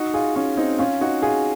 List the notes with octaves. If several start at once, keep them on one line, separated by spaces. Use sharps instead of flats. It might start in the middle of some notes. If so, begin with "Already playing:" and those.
Already playing: D#4 F#4
F4 G#4
C#4 F4
C4 D#4
C#4 F4
D#4 F#4
F4 G#4